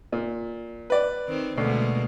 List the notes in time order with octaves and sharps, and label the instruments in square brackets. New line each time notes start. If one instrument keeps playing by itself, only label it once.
[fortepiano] A#2
B4 D5
[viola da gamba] D#3 C4
[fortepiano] D2 [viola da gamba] B2 G#3 A#3